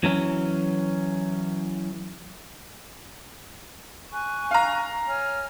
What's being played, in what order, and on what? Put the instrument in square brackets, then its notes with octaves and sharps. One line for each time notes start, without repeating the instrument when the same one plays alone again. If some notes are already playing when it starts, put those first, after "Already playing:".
[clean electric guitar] E3 F#3 C#4
[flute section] G#5 C#6 F#6
[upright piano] F5 A#5
[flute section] C#5 G#5 F6